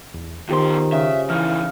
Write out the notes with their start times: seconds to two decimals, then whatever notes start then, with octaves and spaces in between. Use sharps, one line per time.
0.14 E2
0.49 E2 D#3 F4 G4 C5 C6
0.92 C#3 E5
1.30 E3 F3 D#4 F5